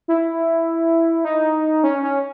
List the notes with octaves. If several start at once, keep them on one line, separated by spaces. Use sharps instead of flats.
E4
D#4
C#4
C#4